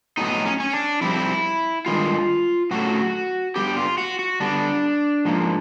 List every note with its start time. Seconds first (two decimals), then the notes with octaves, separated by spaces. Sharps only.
0.17 A2 F#3 B3 D#4
0.46 C#4
0.60 C#4
0.73 D4
1.01 F2 D3 G3 C4 E4
1.86 G2 D#3 G#3 F4
2.71 A2 F#3 A3 C#4 F#4
3.56 G2 E3 G3 B3 G4
3.77 F4
3.98 F#4
4.19 F#4
4.40 D3 G3 B3 D4
5.25 G#2 F3 A#3